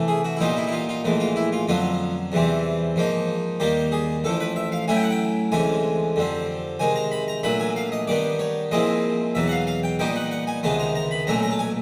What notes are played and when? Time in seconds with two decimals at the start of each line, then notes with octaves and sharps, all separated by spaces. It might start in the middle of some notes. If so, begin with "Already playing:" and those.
Already playing: C3 E3 A3
0.08 G#4
0.24 F#4
0.37 E4
0.40 A#2 G3 B3 D#4 F4
0.57 E4
0.67 E4
0.72 F4
0.89 F4
1.04 A#1 A2 E3 G#3
1.20 F4
1.36 E4
1.53 F4
1.68 F2 D3 F#3 B3 F4
2.32 E2 C3 E3 G3 C4
2.96 G#2 F3 A#3 D#4
3.60 D#2 D#3 G3 A#3 G4
3.92 G#4
4.24 A1 A2 F3 A4
4.40 B4
4.56 E5
4.72 F5
4.88 A2 F#3 A3 C#4 E4 G#5
4.95 G5
5.03 F#5
5.11 G5
5.52 D2 C3 E3 G#3 C#4 G#5
6.16 F2 D3 G3 C4
6.79 C3 D#3 G#3 G#5
6.96 A#5
7.11 B5
7.28 A#5
7.43 A#2 F#3 A3 D4 B5
7.60 G#5
7.76 F5
7.92 D#5
8.07 G2 D#3 G3 B3 D5
8.39 C#5
8.71 A#2 F3 G#3 C4 E4 D#5
9.35 E2 B2 F#3 E5
9.47 F#5
9.51 F5
9.67 F5
9.83 G5
9.99 A#2 G3 B3 D#4 G5
10.16 F#5
10.31 F#5
10.47 G#5
10.63 C#2 C3 D#3 G#3 B3 A5
10.80 A#5
10.95 A#5
11.11 B5
11.27 B1 A#2 F#3 A3 C#4 A#5
11.43 A#5
11.51 A5
11.59 G#5